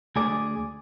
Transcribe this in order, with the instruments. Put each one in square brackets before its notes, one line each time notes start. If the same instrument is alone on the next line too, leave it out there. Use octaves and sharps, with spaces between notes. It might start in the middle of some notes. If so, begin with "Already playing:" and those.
[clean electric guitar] D2 G#4 D5